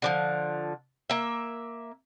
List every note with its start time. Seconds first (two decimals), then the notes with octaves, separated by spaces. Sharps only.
0.02 D3 E3 F3
1.10 A#3 E5